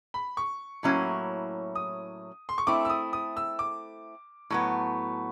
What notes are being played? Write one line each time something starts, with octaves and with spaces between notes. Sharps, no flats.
B5
C#6
A2 F#3 A#3 C#4 E4
D#6
C6
C#6
A3 C4 E4 D6
E6
D#6
D#6
E6
D6
A2 F#3 B3